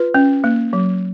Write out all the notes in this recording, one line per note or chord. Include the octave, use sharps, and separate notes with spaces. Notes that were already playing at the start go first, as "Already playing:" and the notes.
Already playing: F4 B4
C#4
A#3
F#3